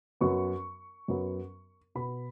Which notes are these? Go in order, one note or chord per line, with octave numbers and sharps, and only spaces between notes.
F#2 F#3 B3 C#6
F#2 F#3 B3
B2 B3 B5